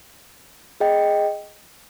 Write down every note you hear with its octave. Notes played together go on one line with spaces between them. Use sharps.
G#4 D#5 G5